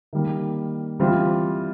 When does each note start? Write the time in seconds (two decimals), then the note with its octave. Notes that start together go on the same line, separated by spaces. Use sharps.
0.13 D#3 G3 A#3
1.00 E3 G3 C4 F4